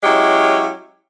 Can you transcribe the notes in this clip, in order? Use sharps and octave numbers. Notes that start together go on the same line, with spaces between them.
F#3 G#3 C#4 E4 G4